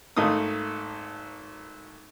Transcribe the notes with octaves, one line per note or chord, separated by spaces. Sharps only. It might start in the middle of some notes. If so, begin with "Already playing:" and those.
G#1 A3 A#3 D#4 D#6